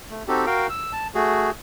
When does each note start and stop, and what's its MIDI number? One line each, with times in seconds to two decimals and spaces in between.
0.11 0.23 57
0.28 0.46 60
0.28 0.46 63
0.28 0.46 66
0.28 0.46 67
0.28 0.46 69
0.47 0.67 66
0.47 0.67 70
0.47 0.67 77
0.47 0.67 79
0.70 0.92 88
0.93 1.07 81
1.15 1.51 57
1.15 1.51 66
1.15 1.51 68